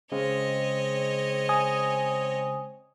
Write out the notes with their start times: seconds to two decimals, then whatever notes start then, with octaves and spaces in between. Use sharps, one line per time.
0.12 C#3 G#3 C4 C#5 D#5
1.49 G#5 D#6